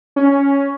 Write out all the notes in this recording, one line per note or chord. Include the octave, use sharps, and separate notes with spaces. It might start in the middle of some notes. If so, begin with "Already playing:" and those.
C#4